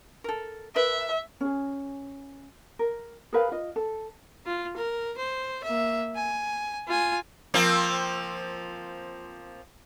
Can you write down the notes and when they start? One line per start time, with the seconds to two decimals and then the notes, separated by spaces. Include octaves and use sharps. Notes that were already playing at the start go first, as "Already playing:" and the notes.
0.24 A4 A#4
0.76 A#4 B4 E5
1.41 C#4 G#4
2.79 A#4
3.33 G#4 A#4 B4 F5
3.52 F4 D#5
3.76 A4
4.46 F4
4.77 A#4
5.18 C5
5.64 A#3 E5
6.16 G#5
6.87 F4 G#5
7.54 F3 A#3 C4